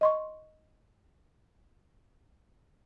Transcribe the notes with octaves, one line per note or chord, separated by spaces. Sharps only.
D#5 C6 C#6